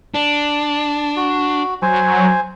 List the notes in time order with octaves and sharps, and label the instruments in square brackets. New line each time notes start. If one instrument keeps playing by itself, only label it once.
[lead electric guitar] D4 [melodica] A5
[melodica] F#4
[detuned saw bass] F#3 [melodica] C5 G#5